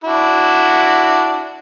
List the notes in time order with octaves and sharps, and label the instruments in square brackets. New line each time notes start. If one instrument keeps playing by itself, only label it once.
[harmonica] D4 E4 F#4